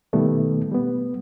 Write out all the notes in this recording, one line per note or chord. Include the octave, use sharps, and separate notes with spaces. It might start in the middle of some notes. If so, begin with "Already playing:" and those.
B2 D#3 G3 A3 B3
G3 B3